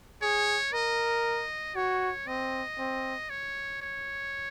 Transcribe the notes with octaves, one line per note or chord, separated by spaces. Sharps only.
G#4 C#5
A#4 D#5
F#4 C#5
C4 D#5
C4
C#5
C#5